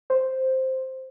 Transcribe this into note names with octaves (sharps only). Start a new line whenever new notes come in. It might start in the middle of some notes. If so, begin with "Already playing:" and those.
C5